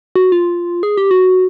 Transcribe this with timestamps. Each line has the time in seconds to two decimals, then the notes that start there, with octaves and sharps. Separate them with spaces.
0.16 F#4
0.32 F4
0.83 G#4
0.97 G4
1.11 F#4